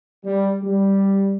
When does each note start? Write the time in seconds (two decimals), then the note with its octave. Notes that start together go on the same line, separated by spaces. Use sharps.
0.25 G3
0.63 G3